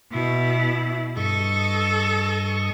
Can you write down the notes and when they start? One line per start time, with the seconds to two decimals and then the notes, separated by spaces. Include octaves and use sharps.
0.11 B2 E4
1.17 G2 A4 D#5 C#6